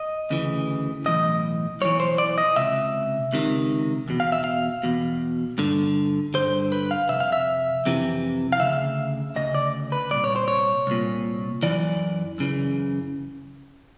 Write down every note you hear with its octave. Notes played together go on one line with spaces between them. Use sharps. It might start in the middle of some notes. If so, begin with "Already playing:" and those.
Already playing: D#5
D2 C#3 E3
B1 A2 E3 D#5
B1 A2 E3 C#5
C5
D5
D#5
C#2 C3 E5
C#2 C3 D#3
E2 B2
F5
E5
F5
E2 B2
G2 D3
G2 D3 C5
B4
F5
F2 C3 E5
F5
E5
F2 C3 E3
F5
D2 C#3 E5
D2 C#3 D#5
D5
B4
C2 A#2 D5
C#5
C5
C#5
C2 A#2
F#2 C#3 E3 D5
F#2 C#3 E3